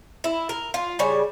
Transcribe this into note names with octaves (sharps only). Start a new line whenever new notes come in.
E4
A#4
F4
C#3 G3 C#5